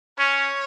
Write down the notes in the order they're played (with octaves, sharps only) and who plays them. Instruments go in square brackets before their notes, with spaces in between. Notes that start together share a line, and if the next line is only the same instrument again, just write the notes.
[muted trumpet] C#4 [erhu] C#5